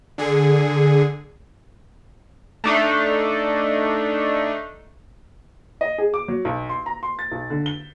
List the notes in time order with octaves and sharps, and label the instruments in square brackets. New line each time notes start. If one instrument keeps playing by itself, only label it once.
[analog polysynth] D3 G#4
A3 D4 D#4
[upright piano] D#5
G#4
D6
F#3
B1
C6
A#5
C6
A6
B1
D3
G7